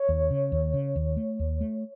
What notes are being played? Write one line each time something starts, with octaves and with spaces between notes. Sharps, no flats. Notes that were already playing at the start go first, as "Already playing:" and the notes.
Already playing: C#5
D#2
C#3
D#2
C#3
D#2
A3
D#2
A3